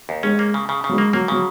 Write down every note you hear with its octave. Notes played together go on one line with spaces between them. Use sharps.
D#2
G#3 C#4
A#3
C#3
C#3
C#3
F#3
G#3 A#3
F#3 A#3
C#3 F#3